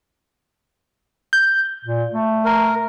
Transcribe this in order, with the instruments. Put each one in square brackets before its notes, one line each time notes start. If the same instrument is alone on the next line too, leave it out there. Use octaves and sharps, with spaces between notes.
[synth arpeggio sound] G6
[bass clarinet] A#2
A3
[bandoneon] A#4